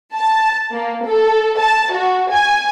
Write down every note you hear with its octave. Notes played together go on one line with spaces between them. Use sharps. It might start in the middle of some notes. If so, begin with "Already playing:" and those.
A5
A#3
A4
A5
F#4
G#5